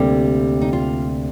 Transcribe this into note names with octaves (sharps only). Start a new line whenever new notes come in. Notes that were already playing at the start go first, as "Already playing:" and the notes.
Already playing: D2 C3 G3 A#3 D4
D#4
F4